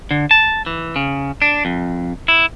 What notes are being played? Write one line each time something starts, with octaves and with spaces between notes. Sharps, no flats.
D3
A5
E3
C#3
D4
F2
E4